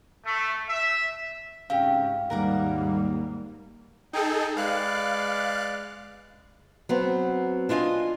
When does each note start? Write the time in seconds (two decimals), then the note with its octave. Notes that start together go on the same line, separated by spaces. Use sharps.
0.24 A3
0.69 E5
1.70 G#2 C#3 C4 F#4 G4 F5
2.30 D#2 G#2 G3 A#3 A#4 F#5 D6
4.13 D#4 G#4 A4 G5
4.56 G#3 B4 D5 F5 F#6
6.89 F#3 B3 C4
7.69 D4 E4 F4 D#5 G#5